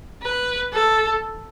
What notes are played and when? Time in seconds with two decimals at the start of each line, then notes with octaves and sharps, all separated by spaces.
0.22 B4
0.73 A4